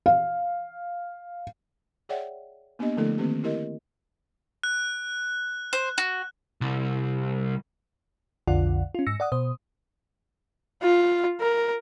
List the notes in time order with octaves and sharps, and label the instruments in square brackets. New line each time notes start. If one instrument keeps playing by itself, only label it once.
[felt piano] F5
[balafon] G#4 C#5 D5 E5 F#5 G5
A#3 B3 D4 G4 D#5
D3 F3 A3 D4 E4 A4
D#3 A#3 C4 G4
E4 G4 A#4 D#5
[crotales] F#6
[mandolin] C5
F#4
[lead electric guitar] C2
[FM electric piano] B1 F2 D3 F4 D5 F#5
C#4 F4
G#2 E6 A#6 C#7
D5 F#5 D#6
B2 C5 D#6
[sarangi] F4
A#4